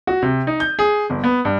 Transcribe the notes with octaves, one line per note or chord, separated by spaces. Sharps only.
F#4
C3
D#4
G6
G#4
G1
B3
G2